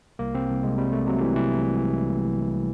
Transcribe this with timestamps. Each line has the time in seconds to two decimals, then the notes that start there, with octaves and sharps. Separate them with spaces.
0.19 C2 A#3
0.34 C3 C4
0.49 C2
0.63 C2 G#3
0.78 C3 G3
0.92 C3 A3
1.07 C3 F#3
1.21 C3 E3
1.36 C2 E3